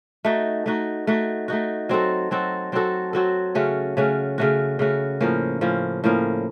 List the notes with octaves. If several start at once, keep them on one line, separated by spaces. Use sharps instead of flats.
A3 D#4 F#4
A3 D#4 F#4
A3 D#4 F#4
A3 D#4 F#4
F#3 C4 F#4 A4
F#3 C4 F#4 A4
F#3 C4 F#4 A4
F#3 C4 F#4 A4
C#3 A3 C#4 F#4
C#3 A3 C#4 F#4
C#3 A3 C#4 F#4
C#3 A3 C#4 F#4
A2 F3 A#3 C#4
A2 F3 A#3 C#4
A2 F3 A#3 C#4